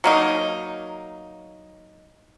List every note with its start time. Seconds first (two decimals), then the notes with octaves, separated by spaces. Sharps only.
0.04 F#3 A#3 D#4